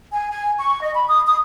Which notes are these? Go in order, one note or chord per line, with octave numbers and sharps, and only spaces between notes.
G#5
G#5
C#6
D#5
B5
D#6
D#6